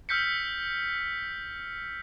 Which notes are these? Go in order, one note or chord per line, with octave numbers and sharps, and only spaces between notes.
E6 F6 G6 B6 C#7